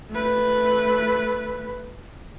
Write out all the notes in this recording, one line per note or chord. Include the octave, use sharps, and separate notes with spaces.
A3 B4